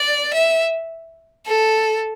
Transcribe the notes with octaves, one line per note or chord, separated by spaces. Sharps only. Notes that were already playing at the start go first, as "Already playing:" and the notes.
Already playing: D5
E5
A4